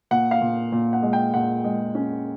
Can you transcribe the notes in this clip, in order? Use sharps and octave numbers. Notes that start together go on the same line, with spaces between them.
A#2 F#5
F5
A#2
A#2
F#5
G#3
G5
A#2 F#5
G#3
C#4